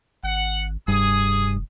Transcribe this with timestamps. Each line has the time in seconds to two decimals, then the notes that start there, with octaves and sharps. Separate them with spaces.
0.23 G#1 F#5
0.88 F1 G2 G#4 D#6